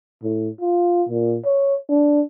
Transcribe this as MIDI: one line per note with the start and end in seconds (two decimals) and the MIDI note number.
0.23 0.49 45
0.61 1.04 65
1.09 1.37 46
1.46 1.76 73
1.89 2.22 62